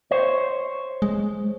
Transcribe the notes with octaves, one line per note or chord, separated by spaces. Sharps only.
C5 C#5
G#3